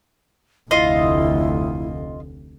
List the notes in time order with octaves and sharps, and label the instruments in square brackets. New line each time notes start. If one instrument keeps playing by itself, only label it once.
[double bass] F1 D2 [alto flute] E4 [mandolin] F4 D#5